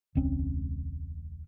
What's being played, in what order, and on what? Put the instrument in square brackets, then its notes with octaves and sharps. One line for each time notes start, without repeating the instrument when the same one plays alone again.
[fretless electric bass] E1 C#2 C4 C#4